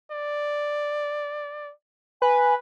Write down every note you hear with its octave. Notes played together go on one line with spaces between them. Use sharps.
D5
B4 G#5